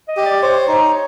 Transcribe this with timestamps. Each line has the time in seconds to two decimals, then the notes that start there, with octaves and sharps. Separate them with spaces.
0.08 D#5
0.17 G4
0.26 D5
0.42 C5 C#5
0.68 D#4